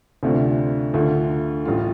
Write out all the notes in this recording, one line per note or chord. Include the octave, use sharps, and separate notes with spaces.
D2 C3 A3 D4 F4
D2 D3 A3 F4
A1 A2 G3 F4